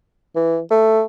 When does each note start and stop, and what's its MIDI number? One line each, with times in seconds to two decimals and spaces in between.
0.35 0.59 52
0.70 1.02 57